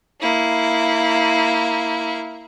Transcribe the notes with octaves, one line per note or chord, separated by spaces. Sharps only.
A#3 E4